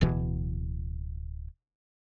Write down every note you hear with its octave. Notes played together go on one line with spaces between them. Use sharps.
D1 B2 E3